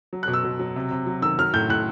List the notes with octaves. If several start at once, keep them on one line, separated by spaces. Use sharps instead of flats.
F#3
F#6
B2
E6
B2
F#3
C3
C3
F#3
D#3 E6
F#3 F6
A2 G6
A2 F#6